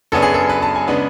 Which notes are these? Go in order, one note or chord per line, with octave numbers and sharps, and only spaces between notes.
F#2 C#3 F#3 B3 D4 A4
G#4
A4
B4
A5
G#5
C#3 G#3 B3 D4